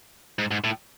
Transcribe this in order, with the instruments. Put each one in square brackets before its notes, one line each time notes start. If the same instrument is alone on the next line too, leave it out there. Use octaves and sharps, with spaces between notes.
[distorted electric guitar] G#2
G#2
A2